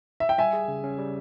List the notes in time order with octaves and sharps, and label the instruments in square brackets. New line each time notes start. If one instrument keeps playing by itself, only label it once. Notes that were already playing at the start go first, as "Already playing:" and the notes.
[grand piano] E5
G5
[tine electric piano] G3 [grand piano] E5 G#5
[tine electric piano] G#4
C#3
C#4
G3